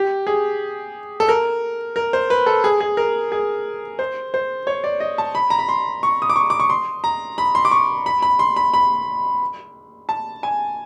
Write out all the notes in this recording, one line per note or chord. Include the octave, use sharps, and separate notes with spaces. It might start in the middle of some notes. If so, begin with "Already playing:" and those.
Already playing: G4
G#4
A4
A#4
A#4
C5
B4
A4
G#4
G#4
A#4
G#4
C5
C5
C#5
D5
D#5
A5
B5
A#5
B5
C6
C#6
D#6
D6
C#6
D6
C#6
C6
A#5
B5
C6
D6
C#6
B5
B5
C6
B5
B5
A5
G#5